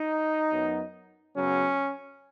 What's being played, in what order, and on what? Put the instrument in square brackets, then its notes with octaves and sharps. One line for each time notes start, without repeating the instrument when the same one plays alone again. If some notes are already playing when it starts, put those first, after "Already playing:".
Already playing: [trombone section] D#4
F#2 F#3 B3
F#2 C#3 F#3 B3 C#4